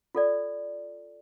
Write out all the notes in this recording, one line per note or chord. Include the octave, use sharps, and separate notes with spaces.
F4 A4 D5